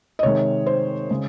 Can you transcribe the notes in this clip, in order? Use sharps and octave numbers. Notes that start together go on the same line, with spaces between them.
D#5
C3 D#3 G#3 C#5
C5
C#3 G#3